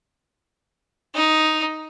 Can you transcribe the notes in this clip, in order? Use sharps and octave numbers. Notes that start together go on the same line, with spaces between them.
D#4